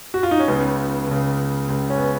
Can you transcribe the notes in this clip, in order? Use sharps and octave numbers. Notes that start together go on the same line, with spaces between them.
F#4
F4
D#4
C#4
C#2 C#3 B3
C#2 C#3
C#2 C#3
C#4
B3